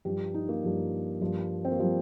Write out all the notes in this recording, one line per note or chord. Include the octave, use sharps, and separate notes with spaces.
G2 F3 G4
D#4
A#3
G2 F3
G2 F3
C4
A#3
F3 G3